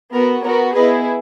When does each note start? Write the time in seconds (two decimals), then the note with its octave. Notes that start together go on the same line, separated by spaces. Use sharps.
0.14 B3 F#4 A#4
0.44 B3 F#4 A#4 C#5
0.75 B3 E4 G#4 B4 D#5